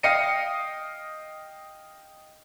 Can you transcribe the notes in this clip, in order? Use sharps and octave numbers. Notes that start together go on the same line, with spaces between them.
D#5 F5 G5 A#6 C#7 D#7